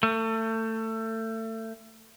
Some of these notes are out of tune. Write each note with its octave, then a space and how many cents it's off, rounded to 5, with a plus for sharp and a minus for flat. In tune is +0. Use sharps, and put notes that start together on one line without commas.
A3 +25